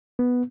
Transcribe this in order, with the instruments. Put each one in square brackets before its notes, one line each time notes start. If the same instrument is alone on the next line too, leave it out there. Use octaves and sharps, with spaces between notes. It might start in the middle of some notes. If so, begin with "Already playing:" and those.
[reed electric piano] B3